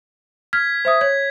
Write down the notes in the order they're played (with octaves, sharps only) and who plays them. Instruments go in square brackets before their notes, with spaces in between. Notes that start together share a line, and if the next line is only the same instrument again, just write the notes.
[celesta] F6 [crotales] G#6 B6
[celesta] C5 E5 D#6
[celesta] C#5 [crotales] G#6